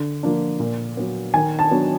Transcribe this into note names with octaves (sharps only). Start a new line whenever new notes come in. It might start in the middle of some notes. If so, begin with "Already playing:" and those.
Already playing: D3
F3 A#3 D4
A#2
F#3 B3
D#3 G#5
A5
F#3 B3 D4